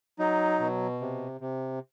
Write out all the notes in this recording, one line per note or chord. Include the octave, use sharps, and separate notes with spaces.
F#3 D#4
B2
C3
C3